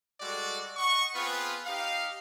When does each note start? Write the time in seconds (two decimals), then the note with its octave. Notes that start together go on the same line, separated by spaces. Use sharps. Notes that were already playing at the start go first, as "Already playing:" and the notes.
0.21 G3 G#3 F#4 A4 D5
0.77 D#5 F#5 C#6
1.15 B3 C4 F4 G#4 B4
1.65 D#4 G4 F5